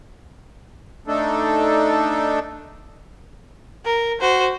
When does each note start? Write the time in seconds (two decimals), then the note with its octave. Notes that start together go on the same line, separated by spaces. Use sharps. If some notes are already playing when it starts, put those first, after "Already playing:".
1.07 A3 D4 D#4 A4
3.85 A#4
4.21 F#4 C5